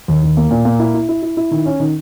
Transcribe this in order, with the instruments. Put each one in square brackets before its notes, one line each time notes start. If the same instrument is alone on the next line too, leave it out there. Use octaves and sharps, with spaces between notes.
[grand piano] D#2
D#2
A#3
A#2
A#3
E4
E4
E4
E4
E4
D#3
C#4
D#3